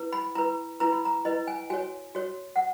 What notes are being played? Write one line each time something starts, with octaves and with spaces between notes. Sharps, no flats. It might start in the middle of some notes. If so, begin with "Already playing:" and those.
Already playing: E4 B4
B5
E4 B4 A#5
E4 B4 A#5
B5
A#5
E4 B4 D#5
G#5
F#4 C#5 G#5
F#4 C#5
F#5